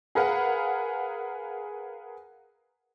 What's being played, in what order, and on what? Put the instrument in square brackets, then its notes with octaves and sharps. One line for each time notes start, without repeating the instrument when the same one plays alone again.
[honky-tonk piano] G#4 A#4 B4 F5 F#5